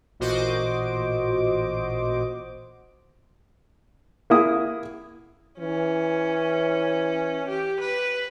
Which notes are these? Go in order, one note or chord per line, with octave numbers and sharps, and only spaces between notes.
A1 A#2 F#4 C5 D#5 D6
A#3 E4 D#6
E3 C#4
G4
B4